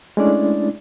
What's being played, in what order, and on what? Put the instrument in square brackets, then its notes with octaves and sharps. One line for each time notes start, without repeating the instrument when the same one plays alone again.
[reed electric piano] G#3 A3 C#4 D4 E4 D5